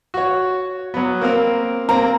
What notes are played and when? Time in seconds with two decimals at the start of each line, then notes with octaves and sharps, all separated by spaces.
0.14 F#4 C#5
0.94 F#3 B3
1.21 A#3 C4 A#4
1.89 A#3 C4 A#5